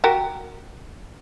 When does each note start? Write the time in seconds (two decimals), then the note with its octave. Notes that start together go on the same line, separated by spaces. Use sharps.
0.04 F#4 G4 A#4